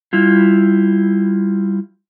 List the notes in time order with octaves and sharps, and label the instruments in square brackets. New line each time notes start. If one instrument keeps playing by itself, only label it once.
[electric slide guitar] G3 E4 F4